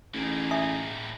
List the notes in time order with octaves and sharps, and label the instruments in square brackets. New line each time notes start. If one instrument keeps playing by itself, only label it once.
[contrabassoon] A1 [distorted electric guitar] A2 A#3 [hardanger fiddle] D#4 G#4
[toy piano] E5 G#5 D#6